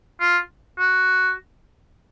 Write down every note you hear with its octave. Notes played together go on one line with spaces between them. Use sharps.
F4
F#4